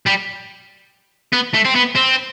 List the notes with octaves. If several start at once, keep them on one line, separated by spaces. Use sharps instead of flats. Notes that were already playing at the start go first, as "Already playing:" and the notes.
G3
B3
A3
C4
B3
C4